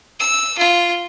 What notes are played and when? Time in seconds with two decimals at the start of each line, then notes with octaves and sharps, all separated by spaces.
0.20 E6
0.58 F4